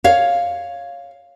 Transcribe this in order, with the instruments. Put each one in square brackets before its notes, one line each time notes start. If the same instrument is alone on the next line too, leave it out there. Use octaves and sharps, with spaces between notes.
[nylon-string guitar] C#5 F5